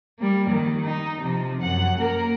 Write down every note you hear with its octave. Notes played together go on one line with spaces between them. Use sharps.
G3 A#3
D#3
D#4
C3 F3
F#2 F#5
A#3 A#4